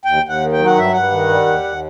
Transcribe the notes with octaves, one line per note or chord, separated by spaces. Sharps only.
D#2 G5
D#2
F#5
D#3
G5
F#3
F#5
G2 E5
G2 F#5
D#3
G3
D#2
D#2